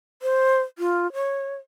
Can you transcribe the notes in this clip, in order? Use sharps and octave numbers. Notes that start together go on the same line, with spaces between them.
C5
F4
C#5